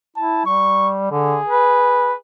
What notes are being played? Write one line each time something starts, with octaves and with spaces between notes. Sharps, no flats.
E4 A5
G3 C#6
D3 G#4
B4